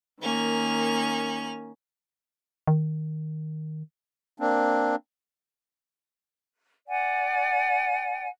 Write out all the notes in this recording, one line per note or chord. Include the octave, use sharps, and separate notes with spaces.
D#3 A#3 C#4 F7
D#3
A#3 C4 D4
D5 F#5 G#5